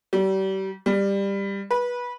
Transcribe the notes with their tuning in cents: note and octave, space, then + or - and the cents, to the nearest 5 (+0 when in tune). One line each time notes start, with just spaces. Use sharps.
G3 -35
G3 +15
B4 -20